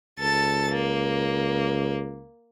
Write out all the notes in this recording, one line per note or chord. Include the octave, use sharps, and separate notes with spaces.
C#2 A4 A6
A#3